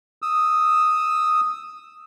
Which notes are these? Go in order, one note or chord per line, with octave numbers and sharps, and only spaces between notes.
D#6 E6